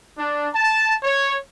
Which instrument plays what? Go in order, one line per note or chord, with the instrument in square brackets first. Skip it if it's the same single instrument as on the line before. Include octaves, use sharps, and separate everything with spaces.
[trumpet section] D4
A5
C#5